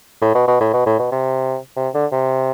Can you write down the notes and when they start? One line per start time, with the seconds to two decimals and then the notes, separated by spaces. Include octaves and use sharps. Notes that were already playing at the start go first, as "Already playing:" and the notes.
0.22 A2
0.34 B2
0.47 B2
0.60 A2
0.73 B2
0.86 A2
0.99 B2
1.12 C3
1.77 C3
1.94 D3
2.12 C3